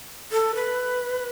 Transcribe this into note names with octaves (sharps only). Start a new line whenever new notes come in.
A4
B4